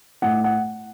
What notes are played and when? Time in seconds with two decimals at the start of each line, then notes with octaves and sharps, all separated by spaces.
0.22 A2 F#5
0.44 F#5